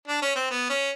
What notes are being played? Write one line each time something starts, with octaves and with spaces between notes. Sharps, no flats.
D4
C#4
C4
B3
C#4